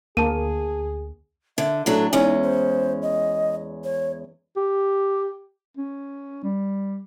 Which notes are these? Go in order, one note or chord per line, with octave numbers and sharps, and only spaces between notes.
D2 A#3 G#4 A5 D#7
D3 E5
A2 F#3 D4 A4
E2 G#3 C#4 D#4
C5
D#5
C#5
G4
C#4
G3